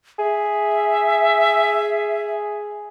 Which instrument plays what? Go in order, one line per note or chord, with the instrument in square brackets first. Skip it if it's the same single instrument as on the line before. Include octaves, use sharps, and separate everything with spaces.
[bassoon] G#4 [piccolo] E5